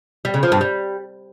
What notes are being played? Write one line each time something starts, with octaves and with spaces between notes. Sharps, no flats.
G3
C#3
F3
G2
G3